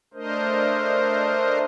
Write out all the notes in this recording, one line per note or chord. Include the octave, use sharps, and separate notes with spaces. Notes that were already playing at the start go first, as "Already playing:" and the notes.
A3 D4 A#4 C5 D#5